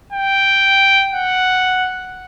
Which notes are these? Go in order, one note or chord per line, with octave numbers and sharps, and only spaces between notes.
G5
F#5